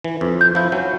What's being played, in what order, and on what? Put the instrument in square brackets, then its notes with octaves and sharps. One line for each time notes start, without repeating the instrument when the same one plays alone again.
[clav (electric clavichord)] E3
F2
[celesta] G6
[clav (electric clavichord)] F3 E4
F#3 C#4